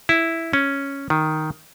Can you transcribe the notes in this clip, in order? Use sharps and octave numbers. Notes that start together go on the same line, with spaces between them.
E4
C#4
D#3